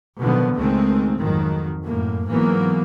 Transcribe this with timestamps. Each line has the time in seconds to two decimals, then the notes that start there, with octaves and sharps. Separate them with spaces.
0.20 B2 D3 D#3 F3 F#3 B3
0.56 C#2 D#3 G#3 A3 C4
1.19 G#1 F2 D#3 F#3
1.86 F#2 A2 A#3
2.28 G#2 E3 F#3 A#3 B3